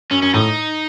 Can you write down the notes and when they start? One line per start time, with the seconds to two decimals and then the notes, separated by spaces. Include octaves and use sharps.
0.11 F#2 C#4
0.22 F#2 C#4
0.34 A2 D#4